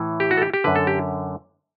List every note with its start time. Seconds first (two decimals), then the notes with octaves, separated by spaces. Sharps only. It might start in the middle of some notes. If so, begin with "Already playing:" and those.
Already playing: A2 E3
0.20 G4
0.31 F#4
0.37 A4
0.42 G4
0.54 G4
0.64 F#2 D3 B4
0.76 A4
0.87 G4